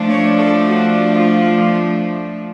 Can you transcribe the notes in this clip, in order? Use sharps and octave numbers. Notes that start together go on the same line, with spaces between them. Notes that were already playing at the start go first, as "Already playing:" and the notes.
Already playing: F3 A3 D4
C#5
A4
F#4
F4